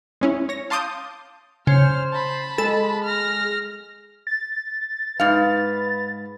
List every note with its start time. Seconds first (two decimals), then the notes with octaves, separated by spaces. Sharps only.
0.21 G#3 C#4 E4
0.49 C#5 A#6
0.70 F5 A5 C6 D6 D#6 G6
1.67 C#3 C5 F6
2.13 A5 B5
2.58 G#3 A4
3.04 F6 A#6
4.27 A6
5.20 G#2 B4 F5